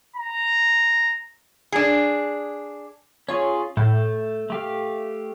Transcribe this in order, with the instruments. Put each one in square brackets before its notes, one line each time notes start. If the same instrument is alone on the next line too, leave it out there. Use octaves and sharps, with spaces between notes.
[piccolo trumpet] A#5
[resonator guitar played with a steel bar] D4 G#4
[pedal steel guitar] C#4 F4 G#4 [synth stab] C#5
[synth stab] A2 [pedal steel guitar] A3 G6
[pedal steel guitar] A3 G4 F5